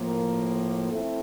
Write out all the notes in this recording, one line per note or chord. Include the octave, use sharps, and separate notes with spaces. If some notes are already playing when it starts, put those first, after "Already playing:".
Already playing: A2 F3 A#3
A3 C4 E4 A4